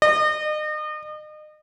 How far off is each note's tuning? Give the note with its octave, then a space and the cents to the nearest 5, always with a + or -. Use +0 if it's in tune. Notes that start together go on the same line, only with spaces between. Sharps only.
D#5 -35